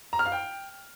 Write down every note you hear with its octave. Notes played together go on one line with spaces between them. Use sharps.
A#5
F6
F5
G5